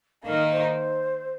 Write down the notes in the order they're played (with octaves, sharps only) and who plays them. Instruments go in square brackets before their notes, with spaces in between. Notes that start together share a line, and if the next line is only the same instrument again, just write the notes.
[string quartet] D#3 A#3 D#4 [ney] A#4
[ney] C5